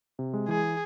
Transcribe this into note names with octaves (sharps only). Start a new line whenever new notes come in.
C3
G#3
E3 G#4